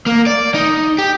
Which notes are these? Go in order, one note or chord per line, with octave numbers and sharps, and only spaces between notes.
A#3
D5
D#4
G4